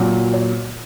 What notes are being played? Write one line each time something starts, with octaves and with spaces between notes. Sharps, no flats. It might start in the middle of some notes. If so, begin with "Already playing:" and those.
Already playing: A#2 F#3
C#5